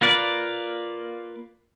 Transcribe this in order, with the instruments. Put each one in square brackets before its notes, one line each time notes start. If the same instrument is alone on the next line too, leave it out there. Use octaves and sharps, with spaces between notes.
[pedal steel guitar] A#3 F4 B4 D5